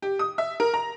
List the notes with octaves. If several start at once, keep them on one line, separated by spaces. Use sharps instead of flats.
G4
D#6
E5
A#4
A#5